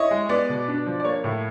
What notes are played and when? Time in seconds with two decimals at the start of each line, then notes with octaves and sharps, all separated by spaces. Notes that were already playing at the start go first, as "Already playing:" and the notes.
Already playing: E4 C#5 D#5
0.11 G#3
0.29 B3 D5
0.49 B2
0.68 D4
0.86 F3
1.00 D5
1.05 A#3 C#5
1.24 A2